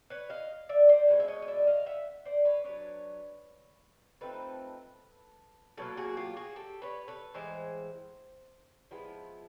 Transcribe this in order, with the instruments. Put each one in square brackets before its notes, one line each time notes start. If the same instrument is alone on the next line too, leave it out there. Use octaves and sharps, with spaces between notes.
[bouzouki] B4 C#5
D#5 F5
D5 E5
C5 D5
B2 G#3 C#4
E5
C#5 D#5
D#5
D5 E5
D#5 F5
E5 F#5
C5 D5
B4 C#5
F#3 B3 D4 B4 C#5
F3 A3 C4 D#4 A4 B4
B2 F#3 A#3 A4 B4
F#4 G#4
F4 G4
F#4 G#4
G4 A4
B4 C#5
A4 B4
A2 E3 G#3 C5
F3 G#3 B3 E4